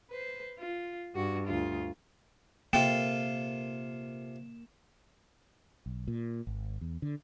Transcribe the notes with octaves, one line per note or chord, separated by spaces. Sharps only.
B4 C5
F4
G2 F#4
D2 F4
C3 A#3 F4 A4 G5 E7
B1
A#2
G#1
E2
D3